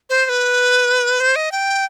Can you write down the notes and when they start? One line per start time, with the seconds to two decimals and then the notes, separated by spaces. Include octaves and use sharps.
0.10 C5
0.25 C5
0.29 B4
1.20 C5
1.36 D#5
1.52 G5